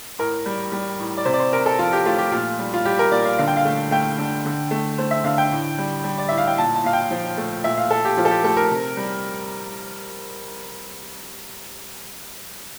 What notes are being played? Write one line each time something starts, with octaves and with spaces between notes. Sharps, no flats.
A2 A#4
G3
G3
A2
D5
C3 C5
D5
C5
C3 A#4
A4
F3 F4
G4
A3 F4
G4
A#2 F4
G3
F4
G3 G4
A#4
A#2 D5
F5
D3 F5
G5
F5
A3
A3 G5
D3
D3
A3
A3 C5
E5
D3 F5
G5
A2
G3
G3
D5
A2 E5
F5
G5
A#2 A5
A5
A#2 F5
G5
F3
A3
A#2 E5
F5
A#2 A4
G4
F3 F4
A4
G4
A3 A4
A#4
C3
G3